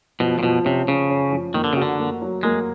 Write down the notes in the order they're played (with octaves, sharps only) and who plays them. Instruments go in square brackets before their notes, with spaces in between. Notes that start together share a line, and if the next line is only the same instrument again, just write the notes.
[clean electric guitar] B2 [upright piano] F3
[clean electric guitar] A#2
[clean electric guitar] B2 [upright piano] F3
[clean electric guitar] C3 [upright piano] C#4
[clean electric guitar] C#3 [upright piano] C#4
[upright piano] C#4
F3
[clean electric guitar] D#3 [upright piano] A#3
[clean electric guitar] D3
[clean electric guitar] C#3 [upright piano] F#4
[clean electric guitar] D3
[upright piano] A#3
F#3
[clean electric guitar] G#3 [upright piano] A#3